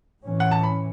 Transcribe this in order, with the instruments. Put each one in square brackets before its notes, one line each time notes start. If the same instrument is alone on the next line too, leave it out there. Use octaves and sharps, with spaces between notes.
[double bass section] A2 E3 C#4
[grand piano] F#5
A5
B5